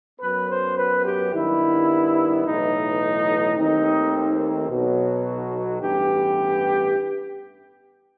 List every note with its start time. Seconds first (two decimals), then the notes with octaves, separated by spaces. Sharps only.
0.20 F#2 F#3 B3 B4
0.49 C5
0.77 B4
1.05 G4
1.33 G2 D#3 G3 B3 E4
2.45 B1 A2 E3 D#4
3.57 D#2 D#3 A3 C4 D#4
4.69 B1 B2 F#3
5.81 A1 G2 E3 B3 G4